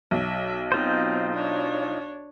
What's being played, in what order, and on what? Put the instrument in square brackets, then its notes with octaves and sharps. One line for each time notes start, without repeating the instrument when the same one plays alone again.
[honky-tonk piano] B1 [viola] E5
[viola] B3 C4 [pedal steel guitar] D#4 F4 C5
[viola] D4 C#5